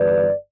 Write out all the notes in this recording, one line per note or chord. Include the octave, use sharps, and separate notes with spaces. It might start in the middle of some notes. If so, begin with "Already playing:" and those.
Already playing: G1 G2 E3 G3 B4 D5